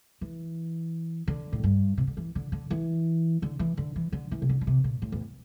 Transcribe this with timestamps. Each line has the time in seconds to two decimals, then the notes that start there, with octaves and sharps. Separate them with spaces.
0.21 E3
1.28 D3
1.52 A2
1.63 G2
1.97 C3
2.07 D3
2.17 E3
2.35 D3
2.52 D3
2.70 E3
3.42 D3
3.59 E3
3.77 D3
3.96 E3
4.12 D3
4.31 E3
4.42 C3
4.49 D3
4.61 D3
4.67 C3
4.84 A#2
5.02 A2
5.12 E2